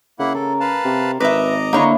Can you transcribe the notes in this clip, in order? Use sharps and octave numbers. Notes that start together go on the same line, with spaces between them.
C#3 A#3 E4 F#5
A4 A#4
B4 F5 A5
C3
G#1 B4 D#5 E5 A#5 D6
D3 A#3 E4 C#5 E5